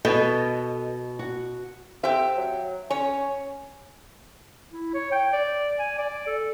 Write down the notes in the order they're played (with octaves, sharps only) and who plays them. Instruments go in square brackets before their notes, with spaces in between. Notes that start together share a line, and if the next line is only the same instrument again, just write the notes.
[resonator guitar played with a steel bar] B2 [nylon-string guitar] B3 A4 D#5
[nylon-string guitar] F#4
[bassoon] C4 [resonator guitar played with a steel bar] G4 E5
[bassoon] F#3
[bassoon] C#4 [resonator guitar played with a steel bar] C#5
[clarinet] E4
C#5
G5
D5
G#5
D5
A4